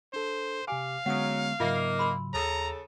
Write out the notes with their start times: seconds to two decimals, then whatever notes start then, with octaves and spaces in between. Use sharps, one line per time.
0.14 D4 A4 C5
0.68 C3 G4 F5 G#5 D6
1.06 D3 F#3 G#3 B3 C#4 F#5 D#6
1.60 G#2 C#3 F#3 A#3 D#4 F4 E5
1.99 B5 C6 E6
2.34 D#2 C#3 A4 A#5